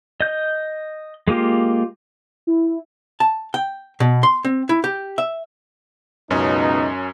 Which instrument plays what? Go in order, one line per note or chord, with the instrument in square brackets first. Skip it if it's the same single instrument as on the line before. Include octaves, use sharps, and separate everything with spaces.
[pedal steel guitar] D#5 G6
G#3 A#3 F4 G4
[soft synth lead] E4
[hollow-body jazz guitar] A5
G5
B2
C6
C4
E4
G4
E5
[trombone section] C#2 B2 D#4 [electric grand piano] F#2 C#4